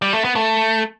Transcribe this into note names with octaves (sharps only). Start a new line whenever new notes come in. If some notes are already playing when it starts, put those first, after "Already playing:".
G3
A3
B3
A3